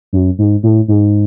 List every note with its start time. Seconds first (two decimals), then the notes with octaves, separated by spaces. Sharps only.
0.13 F#2
0.39 G#2
0.63 A2
0.88 G#2